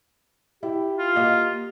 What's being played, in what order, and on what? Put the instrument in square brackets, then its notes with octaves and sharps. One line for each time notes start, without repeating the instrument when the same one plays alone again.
[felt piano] E4 [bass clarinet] G4
[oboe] F4
[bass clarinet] A#3 [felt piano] G4 D#5 F5